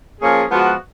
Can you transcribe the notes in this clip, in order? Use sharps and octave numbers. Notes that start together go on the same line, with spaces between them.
F3 A#3 C#4 G#4
F3 G#3 B3 F#4